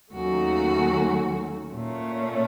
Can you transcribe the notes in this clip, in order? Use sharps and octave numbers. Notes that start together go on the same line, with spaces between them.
D#2 D#3 F#3 A3 C#4 F#4
A#2 A3 C#4